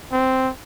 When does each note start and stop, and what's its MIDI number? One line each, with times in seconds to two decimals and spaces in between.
0.12 0.50 60